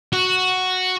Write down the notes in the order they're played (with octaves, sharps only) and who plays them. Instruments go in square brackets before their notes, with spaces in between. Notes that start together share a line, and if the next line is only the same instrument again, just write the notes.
[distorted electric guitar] F#4